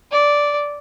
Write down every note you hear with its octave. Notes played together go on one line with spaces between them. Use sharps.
D5